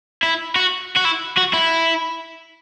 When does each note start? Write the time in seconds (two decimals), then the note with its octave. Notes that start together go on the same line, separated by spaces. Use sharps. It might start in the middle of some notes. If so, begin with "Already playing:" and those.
0.23 E4
0.56 F#4
0.96 F#4
1.04 E4
1.37 F#4
1.53 E4